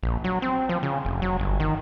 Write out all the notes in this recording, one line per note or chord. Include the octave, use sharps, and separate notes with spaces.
A#1
F#3
C4
F3
C#3
F1
F#3
G1
D#3